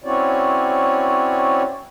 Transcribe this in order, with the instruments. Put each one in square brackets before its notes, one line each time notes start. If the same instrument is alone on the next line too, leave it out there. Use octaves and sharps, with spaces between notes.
[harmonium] C4 C#4 E4 F#4 C#5 D5